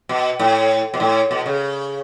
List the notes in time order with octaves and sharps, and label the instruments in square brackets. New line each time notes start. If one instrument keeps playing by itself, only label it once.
[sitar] B2
A2
B2
A2
B2
C#3